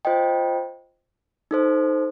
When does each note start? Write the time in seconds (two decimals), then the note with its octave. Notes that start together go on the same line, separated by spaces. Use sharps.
0.05 F4 C5 D#5 G5
1.51 D#4 A4 C5